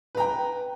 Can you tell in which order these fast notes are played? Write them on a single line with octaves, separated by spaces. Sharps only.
B4 A#5 G5